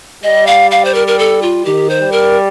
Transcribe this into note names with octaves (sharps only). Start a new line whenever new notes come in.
G3 D#5
F5
F5
C5
A#4
A#4
A4
F4
D#3 G4
C5
G3
A#4